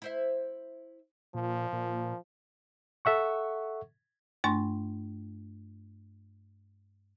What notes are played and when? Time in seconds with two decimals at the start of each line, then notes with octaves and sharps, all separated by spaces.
0.02 E4 C5 E5
1.34 A#2 F3
1.73 A#2
3.05 A4 E5 F#5 C#6
4.44 G2 A3 D4 C6 C#6